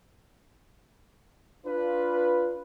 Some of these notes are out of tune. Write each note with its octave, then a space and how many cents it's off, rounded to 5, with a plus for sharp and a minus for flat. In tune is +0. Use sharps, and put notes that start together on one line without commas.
D4 -15 F4 +0 B4 -5